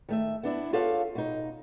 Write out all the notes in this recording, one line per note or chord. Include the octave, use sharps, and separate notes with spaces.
D#3 A3 E5
B3 D4 E4
F4 G4 A4 C#5 F5 F#5
B2 D#4